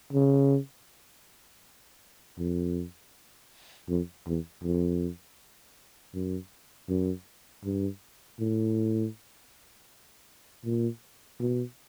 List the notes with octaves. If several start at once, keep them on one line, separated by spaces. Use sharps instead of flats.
C#3
F2
F2
E2
F2
F#2
F#2
G2
A2
A#2
B2